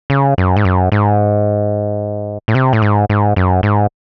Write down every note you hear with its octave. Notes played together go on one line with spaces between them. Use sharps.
C#3
F#2
G#2
F#2
G#2
A2
C3
A2
G#2
G#2
F#2
G#2